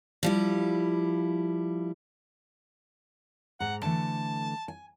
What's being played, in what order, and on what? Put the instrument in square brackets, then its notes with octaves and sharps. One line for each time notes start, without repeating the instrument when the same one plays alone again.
[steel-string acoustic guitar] F3 G3 E4
[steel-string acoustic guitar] G#2 A#5 [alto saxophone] F#5
[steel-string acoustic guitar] D3 E3 A3 [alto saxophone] A5
[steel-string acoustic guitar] G#5